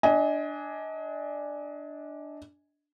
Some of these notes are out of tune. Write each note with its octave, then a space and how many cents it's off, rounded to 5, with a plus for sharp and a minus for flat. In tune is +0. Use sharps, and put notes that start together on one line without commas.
D4 +0 D#5 +30 G#5 +0